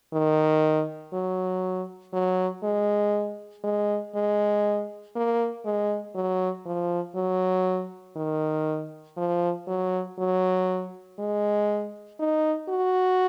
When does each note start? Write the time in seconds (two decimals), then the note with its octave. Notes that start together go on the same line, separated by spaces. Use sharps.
0.13 D#3
1.13 F#3
2.13 F#3
2.63 G#3
3.64 G#3
4.15 G#3
5.16 A#3
5.66 G#3
6.15 F#3
6.65 F3
7.16 F#3
8.17 D#3
9.17 F3
9.68 F#3
10.19 F#3
11.19 G#3
12.20 D#4
12.69 F#4